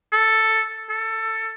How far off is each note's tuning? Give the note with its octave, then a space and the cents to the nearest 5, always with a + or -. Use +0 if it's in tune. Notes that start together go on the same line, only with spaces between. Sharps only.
A4 +5
A4 +15